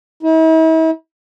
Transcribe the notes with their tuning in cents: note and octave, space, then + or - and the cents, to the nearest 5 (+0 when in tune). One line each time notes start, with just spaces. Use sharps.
E4 -45